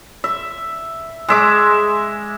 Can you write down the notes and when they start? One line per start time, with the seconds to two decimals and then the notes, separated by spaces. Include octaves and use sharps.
0.24 E5
1.28 G#3 E5 D6